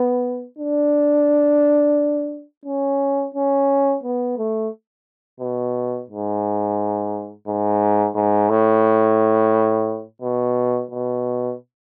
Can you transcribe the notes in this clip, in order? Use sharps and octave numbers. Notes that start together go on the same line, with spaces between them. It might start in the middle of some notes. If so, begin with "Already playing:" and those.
Already playing: B3
D4
C#4
C#4
B3
A3
B2
G#2
G#2
G#2
A2
B2
B2